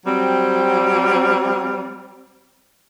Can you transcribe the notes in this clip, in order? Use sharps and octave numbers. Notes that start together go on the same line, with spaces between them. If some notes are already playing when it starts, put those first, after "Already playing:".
F#3 G3 C4